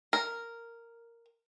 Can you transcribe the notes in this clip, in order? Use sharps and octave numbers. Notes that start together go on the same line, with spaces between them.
A#4